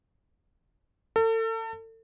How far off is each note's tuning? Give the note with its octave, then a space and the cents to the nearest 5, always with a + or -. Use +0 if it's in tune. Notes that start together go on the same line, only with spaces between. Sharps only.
A4 +35